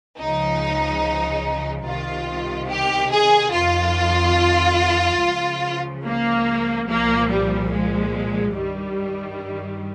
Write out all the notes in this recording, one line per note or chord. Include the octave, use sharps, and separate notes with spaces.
C#2 C#3 F3 D#4
C2 C3 D#3 F4
G4
G#4
F2 D#3 F4
C#2 C#3 F3
A#3
C2 A#2 F3 A#3
G3
G#3
G2 D#3 G3